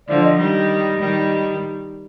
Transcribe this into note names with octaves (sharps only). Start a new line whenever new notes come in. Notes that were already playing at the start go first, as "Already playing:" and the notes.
D3 F3 D5
D#5
D#3 G3
D#3 G3